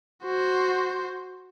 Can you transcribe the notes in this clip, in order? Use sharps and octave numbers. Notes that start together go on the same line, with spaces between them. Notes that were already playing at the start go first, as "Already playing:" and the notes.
F#4 C5